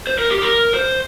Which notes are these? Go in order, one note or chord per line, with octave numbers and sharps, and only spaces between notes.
C5
A#4
G4
A#4
C5